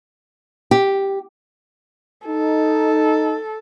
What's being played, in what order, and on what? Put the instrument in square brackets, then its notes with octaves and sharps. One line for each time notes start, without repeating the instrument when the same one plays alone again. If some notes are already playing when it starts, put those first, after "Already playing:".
[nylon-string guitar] G4
[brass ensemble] D#4 [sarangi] A4